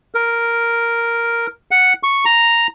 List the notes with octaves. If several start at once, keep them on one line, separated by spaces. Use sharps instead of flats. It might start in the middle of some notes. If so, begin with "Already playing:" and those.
A#4
F#5
C#6
A#5